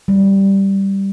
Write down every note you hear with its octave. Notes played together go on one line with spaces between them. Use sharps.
G3